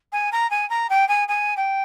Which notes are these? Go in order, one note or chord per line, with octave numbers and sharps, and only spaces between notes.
G#5
A#5
G#5
A#5
G5
G#5
G#5
G5